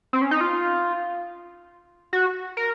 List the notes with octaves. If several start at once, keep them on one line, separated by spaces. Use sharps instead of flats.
C4
C#4
D#4
F4
F#4
A#4